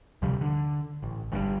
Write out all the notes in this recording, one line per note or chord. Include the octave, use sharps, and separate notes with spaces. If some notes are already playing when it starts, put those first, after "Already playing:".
D2 C3 F3 G3
D3
A1
G1 G2 A#2 G3